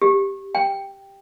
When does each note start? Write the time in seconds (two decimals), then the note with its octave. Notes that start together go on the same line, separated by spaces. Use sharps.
0.02 G4
0.55 G5